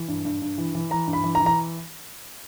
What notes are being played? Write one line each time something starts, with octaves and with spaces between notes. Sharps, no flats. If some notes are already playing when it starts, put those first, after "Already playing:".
Already playing: E3
G2
G2
G2
E3
E3
E3 A#5
G2
B5
E3
A#5
E3
A#5